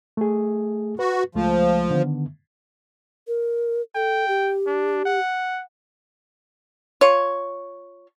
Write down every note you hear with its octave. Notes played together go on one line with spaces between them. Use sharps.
A3 G#4
F#4 B4
C#2 F3 G#3 A3
D3 D#3 B3
A#4
A4 G5
G4
D4
F#5
F4 C#5